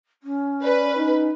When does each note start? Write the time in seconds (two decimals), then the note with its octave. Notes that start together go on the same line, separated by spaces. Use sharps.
0.22 C#4
0.63 B4 D5
0.96 D#4